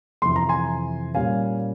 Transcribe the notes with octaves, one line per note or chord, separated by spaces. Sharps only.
F2 C3 E3 C6
A#5
G#5 C6
A#2 G3 C#4 F5 G#5